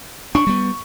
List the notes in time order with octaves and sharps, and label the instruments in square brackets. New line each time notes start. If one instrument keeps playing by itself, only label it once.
[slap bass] D4 [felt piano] C#6
[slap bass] G3 B3